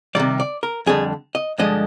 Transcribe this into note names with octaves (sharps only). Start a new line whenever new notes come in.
C3 D#3 G3 D5
D5
A#4
F2 D3 G3 G#4
D#5
G2 D3 F3 G#3 D#5